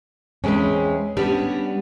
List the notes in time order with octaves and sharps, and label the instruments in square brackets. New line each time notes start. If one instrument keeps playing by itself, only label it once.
[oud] E2 B4 [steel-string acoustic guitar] G#3 C4 C#4
[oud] G3 C#4 [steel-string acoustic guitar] B3 D4